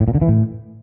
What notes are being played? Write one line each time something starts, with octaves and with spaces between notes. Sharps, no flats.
A2
A#2
D3
E3
A2